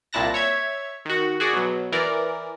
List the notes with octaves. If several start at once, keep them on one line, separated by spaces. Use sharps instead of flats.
C2 A#2 E4 A5 F#6 A#6
C#5 E5 G#6
D#3 F#4
F#4 G#4 D5
B2 F#3
E3 A#4 D5